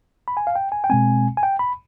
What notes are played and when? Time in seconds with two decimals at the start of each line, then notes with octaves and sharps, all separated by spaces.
0.28 B5
0.37 G#5
0.47 F5
0.56 G5
0.72 G#5
0.84 G5
0.90 B2 G#3 C4 G#5
1.37 G#5
1.43 G5
1.59 B5